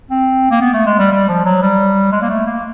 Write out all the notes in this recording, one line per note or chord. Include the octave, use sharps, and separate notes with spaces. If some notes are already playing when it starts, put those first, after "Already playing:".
C4
A#3
B3
A3
G#3
G3
G3
F3
F#3
G3
G#3
A#3
A3
A#3